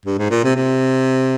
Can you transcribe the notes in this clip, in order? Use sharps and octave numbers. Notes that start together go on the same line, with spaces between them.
G2
G#2
A#2
C3
C3